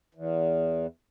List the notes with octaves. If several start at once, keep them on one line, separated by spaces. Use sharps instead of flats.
E2